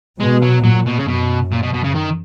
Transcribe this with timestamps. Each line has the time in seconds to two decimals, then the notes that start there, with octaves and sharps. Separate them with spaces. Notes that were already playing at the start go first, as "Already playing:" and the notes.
0.20 B2 G#3
0.43 F#3
0.64 A#2 F#3
0.86 B2
0.99 C#3
1.08 F#2 B2
1.52 A#2
1.63 B2
1.74 B2
1.84 C#3
1.95 D#3